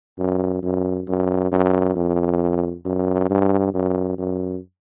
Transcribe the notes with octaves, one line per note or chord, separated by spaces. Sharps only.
F#2
F#2
F#2
F#2
F2
F#2
G2
F#2
F#2